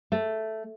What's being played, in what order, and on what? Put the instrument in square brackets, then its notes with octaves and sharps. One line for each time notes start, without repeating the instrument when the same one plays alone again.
[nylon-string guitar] A3